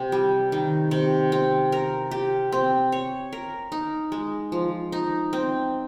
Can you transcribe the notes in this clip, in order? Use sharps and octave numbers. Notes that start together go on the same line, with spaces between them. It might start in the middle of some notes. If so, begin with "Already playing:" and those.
Already playing: C3
G3
D#3
C3
C4
A#4
G4
C4
C#5
A#4
D#4
G#3
F3
D#4
C4